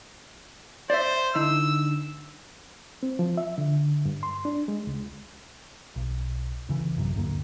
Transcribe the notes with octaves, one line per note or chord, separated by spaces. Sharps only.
C5 D5 E5
D3 D#4 E4 E6
C4
F3
E5
D3
G2
C6
D4
G#3
C#2
B1
C2 C#3 E3
A1 F#2 C3 F#3
D1 D2 G2 A#3